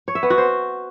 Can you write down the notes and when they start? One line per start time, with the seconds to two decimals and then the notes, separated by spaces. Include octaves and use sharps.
0.08 C#5
0.15 E5
0.23 B3
0.30 F#4
0.38 C5